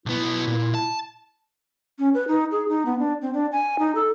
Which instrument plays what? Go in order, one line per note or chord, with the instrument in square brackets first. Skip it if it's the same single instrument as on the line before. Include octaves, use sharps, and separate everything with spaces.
[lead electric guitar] B1 B3 [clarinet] E4
[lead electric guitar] A#2
A5
[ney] C#4
B4
D#4
G#4
D#4
B3
D4
C4
D4
G#5
D#4
A4